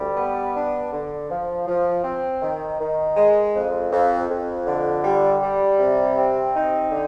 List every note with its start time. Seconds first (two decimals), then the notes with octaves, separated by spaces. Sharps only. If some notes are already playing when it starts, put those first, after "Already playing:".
Already playing: D2 G3
0.17 B3
0.54 D4
0.91 D3
1.30 F3
1.67 F3
2.04 C4
2.41 D#3
2.80 D#3
3.16 G#3
3.54 F2
3.92 F2
4.29 F2
4.67 D3
5.04 G3
5.42 G3
5.79 C3
6.17 C4
6.55 D#4
6.91 D3